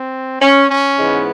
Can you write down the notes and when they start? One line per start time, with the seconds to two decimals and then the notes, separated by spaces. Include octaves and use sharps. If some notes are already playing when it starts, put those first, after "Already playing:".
Already playing: C4
0.42 C#4
0.70 C#4
0.98 G#2 E3 G#3 B3